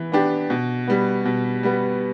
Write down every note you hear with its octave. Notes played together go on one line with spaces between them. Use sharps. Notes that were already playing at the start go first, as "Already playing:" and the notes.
Already playing: E3 B3
B3 D4 G4
B2
G3 B3
B2
G3 B3